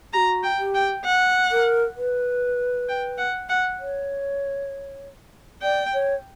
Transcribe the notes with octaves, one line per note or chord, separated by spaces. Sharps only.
G4 A#5
F#4
G5
G4
G5
F#5
A#4
B4
G5
F#5
F#5
C#5
D5 G5
C#5